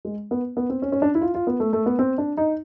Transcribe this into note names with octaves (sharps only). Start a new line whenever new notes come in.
G#3
B3
B3
C4
C#4
C#4
D4
E4
F4
F4
B3
A3
A3
B3
C4
D4
D#4